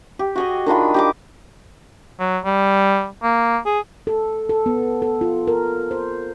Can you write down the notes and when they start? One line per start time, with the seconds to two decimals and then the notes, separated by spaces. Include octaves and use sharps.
0.19 G4
0.36 F#4 G#4 D#5
0.66 D#3 D4 F4 B5
0.94 G4 D#5 D6
2.20 F#3
2.45 G3
3.23 A#3
3.66 G#4
4.07 A4
4.49 A4
4.66 B3
5.02 A4
5.21 F4
5.47 A#4
5.91 C5